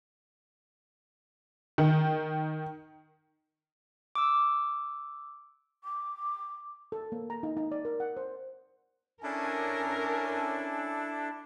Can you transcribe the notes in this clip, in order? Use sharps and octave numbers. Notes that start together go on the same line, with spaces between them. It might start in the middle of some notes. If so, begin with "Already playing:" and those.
D#3
D6 E6
D6
A4
A#3
A#5
D#4
D#4
D5
A#4
F#5
C5
C#4 D4 E4 A4 A#4 G#5